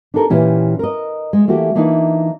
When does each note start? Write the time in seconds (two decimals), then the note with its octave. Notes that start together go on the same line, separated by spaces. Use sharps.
0.14 D4 D#4 G4 A4 A#4
0.30 A#2 E3 C#4 G4
0.79 A#4 D#5
1.33 G#3
1.48 E3 A3 A#3 F#4 G4
1.75 E3 A#3 D4 D#4 F4